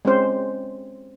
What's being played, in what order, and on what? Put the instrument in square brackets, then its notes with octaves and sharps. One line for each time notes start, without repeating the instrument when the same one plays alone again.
[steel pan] G#3 C4 C#4 C5